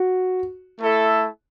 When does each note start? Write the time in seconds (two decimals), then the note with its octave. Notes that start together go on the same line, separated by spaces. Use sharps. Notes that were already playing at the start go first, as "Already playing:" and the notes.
Already playing: F#4
0.79 A3 E4 A4 E5